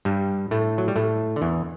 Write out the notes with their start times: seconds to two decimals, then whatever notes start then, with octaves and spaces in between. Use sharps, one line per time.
0.05 G2 G3
0.51 A2 A3
0.78 F#3
0.88 G3
0.96 A2 A3
1.36 D3
1.42 E2 E3